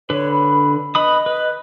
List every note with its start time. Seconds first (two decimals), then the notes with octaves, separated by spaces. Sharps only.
0.10 D3 B4 C#5
0.31 B5
0.95 B4 D#5 B5 D#6
1.26 B4